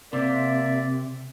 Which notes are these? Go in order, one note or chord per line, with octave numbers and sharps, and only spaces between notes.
C3 A#3 D5 E5